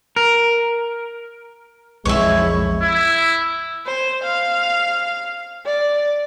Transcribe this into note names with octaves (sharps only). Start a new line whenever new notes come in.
A#4
B1 F2 F3 G#3 E4 C#5
E4
C5
F5
D5